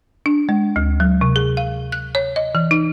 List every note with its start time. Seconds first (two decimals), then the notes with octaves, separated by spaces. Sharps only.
0.26 D4
0.49 G#3
0.76 D2
1.00 F#3
1.21 C3
1.36 G#4
1.57 F5
1.92 F#6
2.15 C#5
2.36 D#5
2.55 E3
2.71 D#4